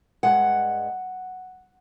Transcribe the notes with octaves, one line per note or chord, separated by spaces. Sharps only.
G2 E3 G#3 F#5